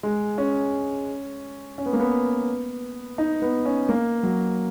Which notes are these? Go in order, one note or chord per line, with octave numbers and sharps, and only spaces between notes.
G#3
C#4
C#4
B3
A#3
B3
D#4
B3
C#4
A#3
F#3